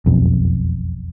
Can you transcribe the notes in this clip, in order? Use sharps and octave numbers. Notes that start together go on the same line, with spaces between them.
E1 B1 F2